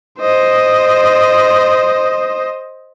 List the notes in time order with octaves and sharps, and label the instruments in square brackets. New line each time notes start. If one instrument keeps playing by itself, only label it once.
[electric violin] C5 D#5